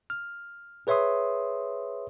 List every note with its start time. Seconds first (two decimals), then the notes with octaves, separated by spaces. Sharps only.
0.10 F6
0.87 G#4 B4 C#5 E5 C6 D#6